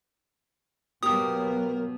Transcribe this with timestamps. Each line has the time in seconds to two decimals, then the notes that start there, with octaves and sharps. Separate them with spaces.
1.03 B2 F#3 A#3 B3 G4 A#4 A#5 D#6